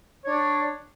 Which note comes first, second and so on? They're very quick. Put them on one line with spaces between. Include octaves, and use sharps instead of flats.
C#5 D4 D5